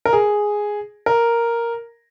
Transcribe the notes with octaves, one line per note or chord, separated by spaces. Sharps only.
A#4
G#4
A#4